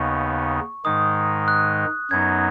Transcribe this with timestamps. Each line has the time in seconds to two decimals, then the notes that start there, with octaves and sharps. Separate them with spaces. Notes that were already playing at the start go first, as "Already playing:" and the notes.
Already playing: D#2 C#3 B3 D#4 C#6
0.85 G#2 D#3 G#3 D#4 D#6
1.48 F#6
2.11 F#2 F#3 B3 D#4 G#6